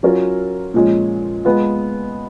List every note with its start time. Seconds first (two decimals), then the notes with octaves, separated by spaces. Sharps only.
0.03 F#3 C#4 F4 A#4
0.74 A#2 F3 G#3 C#4
1.45 G#3 B3 F4